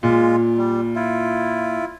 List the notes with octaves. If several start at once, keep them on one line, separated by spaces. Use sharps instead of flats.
A#2 G#3 F4
G3
E4 F4